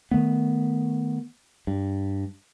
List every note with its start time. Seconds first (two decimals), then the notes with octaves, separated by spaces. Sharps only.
0.11 D#3 F#3 A3 B3
1.67 G2